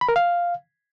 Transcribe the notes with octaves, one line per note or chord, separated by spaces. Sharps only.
B5
A#4
F5